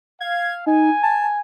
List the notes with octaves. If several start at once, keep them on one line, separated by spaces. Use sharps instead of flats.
F5 G#6
D#4 G#5
A5